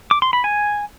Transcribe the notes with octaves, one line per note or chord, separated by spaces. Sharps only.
D6
C6
B5
G#5